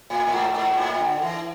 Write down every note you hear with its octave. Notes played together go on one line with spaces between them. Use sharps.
A2
A2
G#2
G#2
A2
D3
E3